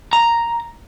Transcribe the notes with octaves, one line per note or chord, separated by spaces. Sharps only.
A#5